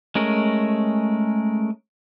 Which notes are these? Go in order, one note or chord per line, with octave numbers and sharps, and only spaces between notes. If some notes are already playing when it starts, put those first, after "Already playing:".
G#3 A3 C#4 A#4